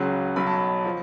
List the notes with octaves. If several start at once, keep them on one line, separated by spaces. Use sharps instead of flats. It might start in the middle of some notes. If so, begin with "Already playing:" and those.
Already playing: C#2 C#3 F#3 F#5
B1 B2 F#3 B5
A5
B5
F3